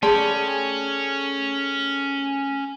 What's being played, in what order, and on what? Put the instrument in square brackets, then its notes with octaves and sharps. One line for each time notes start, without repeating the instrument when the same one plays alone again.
[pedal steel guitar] A3 G4 B5 [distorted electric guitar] C#4 [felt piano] G#4 [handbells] D5 A5 C6